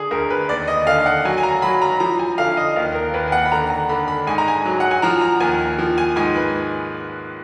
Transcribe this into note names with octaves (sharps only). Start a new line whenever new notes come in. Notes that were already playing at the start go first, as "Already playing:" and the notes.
Already playing: D3 G#4
D2 A#4
B4
D#2 D5
D#5
D3 F5
F#5
F#3 G#5
G#5
A#5
F#3 B5
A#5
B5
F3 A#5
G#5
D3 F5
D#5
D#2 F5
A#4
D#2 B4
G#5
F#5
B5
D3 A#5
A#5
D3 B5
B5
G#2 G#5
A#5
G#5
F#3
F#5
G#5
F3 A#5
A#5
D#2 G#5
F3
G#5
G#2 G#5
B4